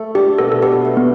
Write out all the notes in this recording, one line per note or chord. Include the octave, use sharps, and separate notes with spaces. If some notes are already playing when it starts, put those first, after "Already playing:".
Already playing: A3
D4 G4
B2 A4
A4
B2 G4
A3
B3